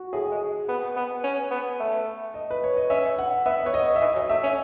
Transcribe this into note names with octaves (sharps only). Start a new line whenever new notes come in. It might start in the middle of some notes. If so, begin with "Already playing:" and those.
Already playing: F#4
A2 G#4
G#3
B3
B3
C#4
B3
A3
D#5
B4
C#5
D#5
C#4 E5
F#5
B3 E5
B3 C#5
D#5
E5
E3 D#5
F#3
A3 E5
C#4